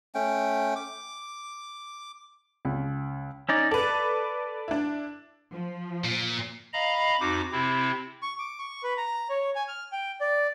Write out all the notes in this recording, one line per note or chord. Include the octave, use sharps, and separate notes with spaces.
A3 C#4 G5
D6
C#2
C#4 D#4 D5
A4 B4 D5
D4 E4
F3
A#2
D#5 F5 A#5 B5
F2 D#4 F#4 D6
C3 C4 E4
C#6
D6
C#6
B4
A#5
C#5
G#5
F6
G5
D5